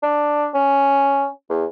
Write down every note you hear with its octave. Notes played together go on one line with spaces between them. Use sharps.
D4
C#4
E2